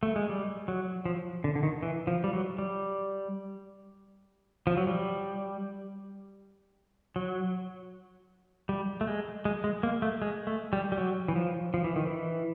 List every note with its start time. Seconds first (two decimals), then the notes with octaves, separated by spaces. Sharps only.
0.03 A3
0.16 G#3
0.29 G3
0.68 F#3
1.05 F3
1.44 D3
1.55 D3
1.63 D#3
1.83 E3
2.07 F3
2.24 G3
2.33 F#3
2.58 G3
4.67 F3
4.77 F#3
4.87 G3
7.16 F#3
8.69 G3
9.01 A3
9.08 G#3
9.45 G#3
9.64 G#3
9.83 A#3
10.02 A3
10.22 G#3
10.47 A3
10.73 G3
10.92 G3
10.98 F#3
11.28 E3
11.36 F3
11.74 F3
11.84 E3
11.96 D#3
12.07 E3